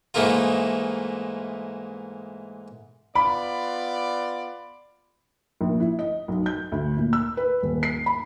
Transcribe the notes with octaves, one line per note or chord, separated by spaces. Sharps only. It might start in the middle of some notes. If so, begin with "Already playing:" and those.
G#2 E3 A3 A#3 D#4 F4
B3 F4 D5 B5
A#1
E4
D#5
B1
G6
D2
A#2
E6
B4
D#1
C7
B5